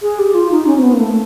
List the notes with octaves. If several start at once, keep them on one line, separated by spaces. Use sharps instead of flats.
G#4
G4
F4
D#4
C#4
C4
B3
A#3
A3